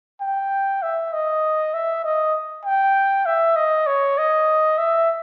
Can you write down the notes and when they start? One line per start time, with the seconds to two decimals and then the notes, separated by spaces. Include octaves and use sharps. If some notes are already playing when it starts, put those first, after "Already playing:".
0.21 G5
0.82 E5
1.13 D#5
1.74 E5
2.04 D#5
2.65 G5
3.26 E5
3.56 D#5
3.87 C#5
4.18 D#5
4.78 E5